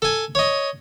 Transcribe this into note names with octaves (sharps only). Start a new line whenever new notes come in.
A4 G#5
C#5 D#5